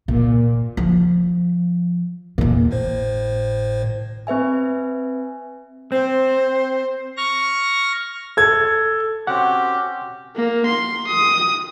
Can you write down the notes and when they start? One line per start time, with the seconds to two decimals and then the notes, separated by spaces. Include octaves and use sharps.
0.08 A#2
0.77 F3
2.38 E2 A#2
2.71 G#1 A2 C5
4.27 C4 B4 E5 G#5
5.92 C4 C5
7.17 C#6 F6 A#6
8.37 A4 G#6
9.27 C4 C#4 F#4 G4 F#5
10.36 A#3
10.66 C6
11.07 D#6